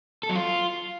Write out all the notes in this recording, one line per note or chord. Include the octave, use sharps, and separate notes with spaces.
A4
F#3
F4